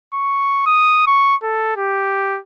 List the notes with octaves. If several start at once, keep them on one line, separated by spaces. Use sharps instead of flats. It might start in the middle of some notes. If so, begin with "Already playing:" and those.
C#6
D#6
C#6
A4
G4